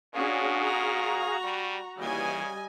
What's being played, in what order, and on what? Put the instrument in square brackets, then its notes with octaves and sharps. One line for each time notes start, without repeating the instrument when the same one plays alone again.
[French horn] A#2 [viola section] C#4 D4 [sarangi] F#4 [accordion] G#4 F5 G#5
[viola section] A#5
[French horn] G3
[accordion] D#2 E3 [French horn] C#3 [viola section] G3 D#5 G#5